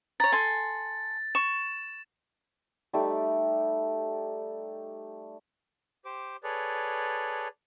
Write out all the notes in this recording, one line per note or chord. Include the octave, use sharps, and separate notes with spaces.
C#5 A#5 A6
A4 G#5 C6
C#6 E7
G3 A3 D#4 G4
G4 C5 D6
G#4 A4 B4 C#5 D5